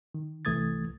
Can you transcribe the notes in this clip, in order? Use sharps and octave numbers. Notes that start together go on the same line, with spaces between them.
D#3
C2 E3 A3 D#6 G#6 A6